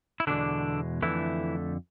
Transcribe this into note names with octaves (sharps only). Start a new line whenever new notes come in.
E4
E2 B2 D3 G#3 D4
F2 D3 E3 A3 E4